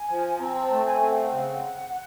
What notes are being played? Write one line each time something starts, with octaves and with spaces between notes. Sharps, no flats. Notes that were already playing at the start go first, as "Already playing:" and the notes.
Already playing: G#5
F3
C4 A#5
A#5
A5
A3
G#5
C4
F#5
F5
F#5
C#3